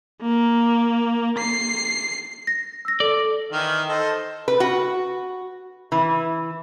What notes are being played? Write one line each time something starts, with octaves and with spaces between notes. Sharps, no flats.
A#3
C7
A#6
E6 A#6
A4 D5
D#3 E3 F5
A4 C5 D#5
B4
F#4
E3